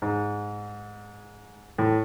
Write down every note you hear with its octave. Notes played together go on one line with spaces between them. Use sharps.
G#2
A2